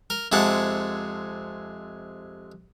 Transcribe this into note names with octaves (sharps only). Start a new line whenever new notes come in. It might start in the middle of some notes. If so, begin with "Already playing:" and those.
A#4
F2 C3 G#3 F#5 A5